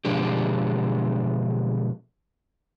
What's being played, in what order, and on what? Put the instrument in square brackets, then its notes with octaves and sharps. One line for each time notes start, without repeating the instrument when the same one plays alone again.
[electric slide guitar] B2 D3 F3 G#3 D4 G4